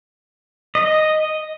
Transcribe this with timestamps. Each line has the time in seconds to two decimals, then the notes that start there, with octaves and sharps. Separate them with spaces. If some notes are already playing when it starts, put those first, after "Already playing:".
0.75 D#5